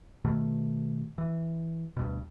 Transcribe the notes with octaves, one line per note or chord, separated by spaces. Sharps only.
B2 D#3 A3
E3
D2 G2 B2